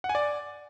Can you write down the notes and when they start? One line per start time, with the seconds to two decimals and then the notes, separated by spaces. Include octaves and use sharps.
0.04 F#5
0.09 G#5
0.15 D5